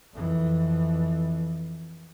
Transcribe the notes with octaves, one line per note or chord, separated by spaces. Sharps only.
F2 E3